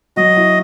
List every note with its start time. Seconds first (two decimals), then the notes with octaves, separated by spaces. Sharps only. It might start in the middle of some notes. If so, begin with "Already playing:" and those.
0.17 F#3 F#4 D#5
0.37 E4